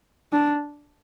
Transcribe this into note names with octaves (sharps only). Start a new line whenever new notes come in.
D4